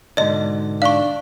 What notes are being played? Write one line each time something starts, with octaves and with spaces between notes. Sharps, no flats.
G#2 B2 D3 D5 D#5
D4 F5 C#6